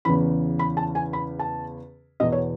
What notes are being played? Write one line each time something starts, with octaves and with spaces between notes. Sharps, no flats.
E2 C#3 E3 B5
B5
A5
G#5
B5
A5
E2 B2 D#5
C#5